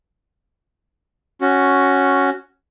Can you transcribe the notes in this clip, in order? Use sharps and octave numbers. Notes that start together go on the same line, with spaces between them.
C#4 F#4